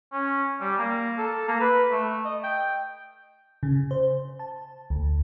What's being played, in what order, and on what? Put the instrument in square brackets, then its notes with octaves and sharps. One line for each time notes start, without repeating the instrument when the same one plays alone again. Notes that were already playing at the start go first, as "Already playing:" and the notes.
[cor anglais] C#4
G3
A#3
A4
A#3
B4
A3
D#5
G5
[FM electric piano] C#3
C5
A5
D2